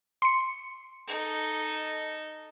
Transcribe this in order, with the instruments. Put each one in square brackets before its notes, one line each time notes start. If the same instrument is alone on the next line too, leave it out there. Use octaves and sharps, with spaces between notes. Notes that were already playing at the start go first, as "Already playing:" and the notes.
[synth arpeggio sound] C6 C#7
[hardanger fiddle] D#4 A4